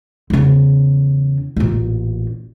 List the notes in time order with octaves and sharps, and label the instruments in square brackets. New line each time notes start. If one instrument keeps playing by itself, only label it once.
[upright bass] E2 C#3
A1 A#2